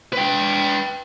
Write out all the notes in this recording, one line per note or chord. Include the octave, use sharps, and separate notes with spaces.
B4 G5